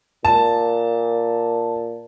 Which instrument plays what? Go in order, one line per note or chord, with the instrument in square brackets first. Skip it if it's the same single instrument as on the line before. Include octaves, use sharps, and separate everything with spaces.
[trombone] A#2 [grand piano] A5